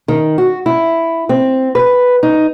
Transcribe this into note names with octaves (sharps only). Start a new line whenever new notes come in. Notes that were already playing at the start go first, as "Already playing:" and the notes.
D#3
F#4
E4
C4
B4
D#4